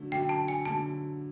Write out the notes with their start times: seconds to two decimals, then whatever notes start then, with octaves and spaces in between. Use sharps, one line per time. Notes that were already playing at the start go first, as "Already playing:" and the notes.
Already playing: D3 F#3 A3
0.12 D3 F#3 A3 G5
0.29 A5
0.48 G#5
0.65 D3 F#3 A3 A5